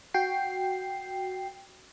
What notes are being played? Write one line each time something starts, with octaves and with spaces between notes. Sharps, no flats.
F#4 G5 C7